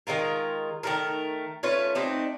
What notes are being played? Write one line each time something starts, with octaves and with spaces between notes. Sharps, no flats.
D#3 G#3 F4 A#4
D#3 A3 A#4
A3 C#4 F4 B4
A3 C4 D4 D#4